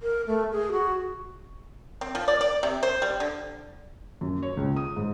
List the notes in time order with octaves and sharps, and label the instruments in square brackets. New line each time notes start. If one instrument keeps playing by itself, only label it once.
[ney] A#4
A3
G#4
F#4
[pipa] C4
F3
D5
D5
C3
C5
G3
D3
[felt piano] F#2
C#5
C#2
D#6
G#2